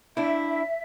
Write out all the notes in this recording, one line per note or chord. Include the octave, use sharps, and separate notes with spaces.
D4 E4 E5